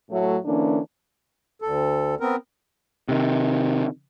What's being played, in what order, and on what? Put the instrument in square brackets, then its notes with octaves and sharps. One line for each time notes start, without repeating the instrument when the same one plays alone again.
[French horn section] A2 F#3 A3
D3 E3 A#3 C#4 D4
[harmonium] D2 A4
B3 C4 A#4
[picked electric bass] C3 D#3